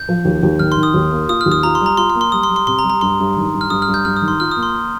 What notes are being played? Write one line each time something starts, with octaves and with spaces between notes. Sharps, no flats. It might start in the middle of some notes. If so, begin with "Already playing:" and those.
Already playing: G6
F3
D#2
D#2
D#3 F6
D#3 C6
D#6
D#2
A#3
F4 D#6
F6
D#2
D#6
F4 A#5
C6
G3
A#5
F4 C6
C6
A#3
C6
G3 D#6
C6
G3
C6
C3 C6
A#5
G3
A#5
G2 C6
G2
D#3
G2
F6
G2 D#6
F6
G2
G6
G2 F6
D#6
D#3
C6
F4 F6
D#6
A#3
C6